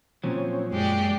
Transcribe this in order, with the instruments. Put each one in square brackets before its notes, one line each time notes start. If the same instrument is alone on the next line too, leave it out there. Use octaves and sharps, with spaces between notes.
[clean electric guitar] A#2 F3 F#3 [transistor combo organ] C4 C#4
[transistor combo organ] F#2 [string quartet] G#3 G4 D5